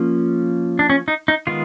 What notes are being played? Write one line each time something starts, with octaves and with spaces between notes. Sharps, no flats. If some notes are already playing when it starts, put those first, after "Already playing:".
Already playing: F3 A#3 C#4
D4
C#4
D#4
D#4
D#3 G#3 B3 F4